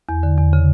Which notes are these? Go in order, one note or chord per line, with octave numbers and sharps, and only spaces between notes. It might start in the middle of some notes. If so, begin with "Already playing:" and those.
E2
D3
E2
C#3